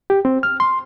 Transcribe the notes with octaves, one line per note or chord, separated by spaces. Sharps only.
G4
C4
F6
C6